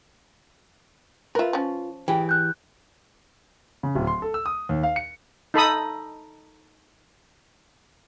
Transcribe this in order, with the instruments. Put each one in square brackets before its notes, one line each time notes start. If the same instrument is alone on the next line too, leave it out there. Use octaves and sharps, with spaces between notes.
[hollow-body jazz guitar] F4 B4 [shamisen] A#4 E5
[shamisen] F3 C#4
[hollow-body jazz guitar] E3 G4 G#4 [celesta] G5
[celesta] F#6 G6
[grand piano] C#3
D1
C6
A4
E6
D#6
D#2
F5
C#7
[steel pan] D#4 A4 B5 D#6